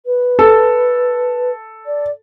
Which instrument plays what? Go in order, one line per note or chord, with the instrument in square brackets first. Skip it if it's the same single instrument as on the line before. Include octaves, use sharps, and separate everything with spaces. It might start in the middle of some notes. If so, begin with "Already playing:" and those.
[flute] B4
[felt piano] A4
[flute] D5